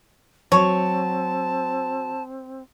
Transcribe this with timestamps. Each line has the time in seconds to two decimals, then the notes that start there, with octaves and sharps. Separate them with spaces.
0.52 F#3 C4 C#5 A5